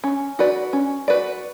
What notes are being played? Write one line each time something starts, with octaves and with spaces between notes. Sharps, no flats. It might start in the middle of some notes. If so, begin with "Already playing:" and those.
C#4
F#4 B4 D5
C#4
F#4 B4 D5